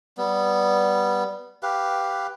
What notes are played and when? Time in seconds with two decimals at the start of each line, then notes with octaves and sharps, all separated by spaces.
0.18 G3 B3
1.63 G4 B4 F5